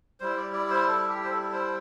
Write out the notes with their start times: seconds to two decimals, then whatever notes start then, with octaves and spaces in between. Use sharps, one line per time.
0.20 G3 E4 C5
0.37 D5
0.53 D5
0.70 C5
0.87 A4
1.08 G4
1.24 C5
1.30 A4
1.43 A4
1.53 C5